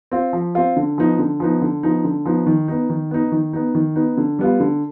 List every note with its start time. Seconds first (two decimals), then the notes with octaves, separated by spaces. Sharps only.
0.12 C4 F4
0.33 F3
0.55 C4 F4
0.76 D3
0.98 F3 B3 D#4
1.19 D3
1.40 F3 B3 D#4
1.62 D3
1.83 F3 B3 D#4
2.04 D3
2.26 F3 B3 D#4
2.47 D#3
2.68 B3 D#4
2.90 D#3
3.11 B3 D#4
3.32 D#3
3.53 B3 D#4
3.75 D#3
3.96 B3 D#4
4.17 D3
4.39 G3 B3 F4
4.60 D3